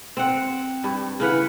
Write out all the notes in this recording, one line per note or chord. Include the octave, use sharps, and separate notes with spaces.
C4 F#5
G2
C#3 E3 B4 F#5